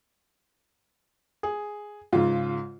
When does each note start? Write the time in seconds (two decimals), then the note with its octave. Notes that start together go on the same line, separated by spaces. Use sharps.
1.43 G#4
2.13 G#2 C#3 F4